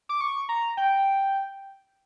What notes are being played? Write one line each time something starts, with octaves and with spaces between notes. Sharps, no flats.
D6
C#6
A#5
G5